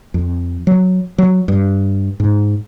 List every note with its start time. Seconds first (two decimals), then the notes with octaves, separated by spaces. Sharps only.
0.14 F2
0.67 F#3
1.18 F#3
1.48 G2
2.20 G#2